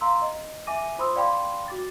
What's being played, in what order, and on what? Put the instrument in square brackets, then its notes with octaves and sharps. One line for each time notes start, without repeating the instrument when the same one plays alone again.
[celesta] F5 A#5 C6 E6
D#5
E5 G#5 D6 A#6 D#7
F4 C5 B5 C6 D#6 E6
D5 F5 G5 B5 C6 D6
F#4 D6 A6